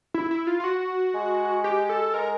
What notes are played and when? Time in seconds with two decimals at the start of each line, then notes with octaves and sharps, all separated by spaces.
0.14 E4
0.31 E4
0.47 F4
0.60 F4
0.64 F#4
1.15 G#3
1.64 G4
1.89 A4
2.14 G#3 A#4